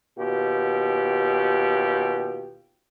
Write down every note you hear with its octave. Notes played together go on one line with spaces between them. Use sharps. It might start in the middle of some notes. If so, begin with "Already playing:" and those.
D#2 B2 F4 G4